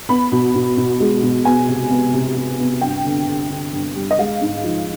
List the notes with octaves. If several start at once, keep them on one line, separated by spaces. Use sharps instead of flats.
B3 B5
B2
B2
B2
G#3
B2
B3 G#5
C3
B3
C3
C3
B3
G2 G5
D3
D3
D3
G2
G3
D#5
G#3 F5
G#2
F3